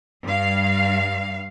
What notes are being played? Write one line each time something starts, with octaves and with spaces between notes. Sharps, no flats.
G2 F5